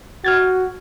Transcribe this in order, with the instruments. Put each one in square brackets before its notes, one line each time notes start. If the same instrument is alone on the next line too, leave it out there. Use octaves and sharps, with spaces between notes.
[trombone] F#4 [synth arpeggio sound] F6 G#6 A6